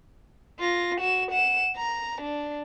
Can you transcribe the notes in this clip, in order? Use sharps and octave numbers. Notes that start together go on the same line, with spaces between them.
F4 A#6
F#4 E7
F#5 E7
A#5
D4